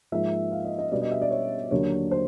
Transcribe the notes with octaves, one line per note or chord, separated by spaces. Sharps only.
G#2 F3 A#3 E5
F5
D#5
D#5
B2 G3 B3 D4 D5
D#5
E5
D5
C#5
D#2 D3 F#3 A#3 D4 C#5
C5